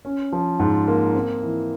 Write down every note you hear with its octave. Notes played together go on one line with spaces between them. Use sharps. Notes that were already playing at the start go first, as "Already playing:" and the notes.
C#4
F3
G#2
A#3
C4
E3